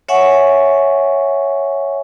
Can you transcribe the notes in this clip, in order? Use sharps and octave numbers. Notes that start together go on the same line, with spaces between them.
C#5 E5 F#5 G#5 C#6